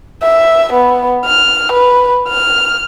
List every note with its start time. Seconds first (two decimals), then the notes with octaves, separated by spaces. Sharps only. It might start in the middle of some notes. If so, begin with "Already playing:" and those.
0.22 E5
0.73 B3
1.25 F6
1.72 B4
2.28 F6